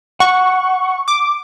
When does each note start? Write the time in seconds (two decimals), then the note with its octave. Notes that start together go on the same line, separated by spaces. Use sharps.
0.20 F#5 C#6
1.08 D6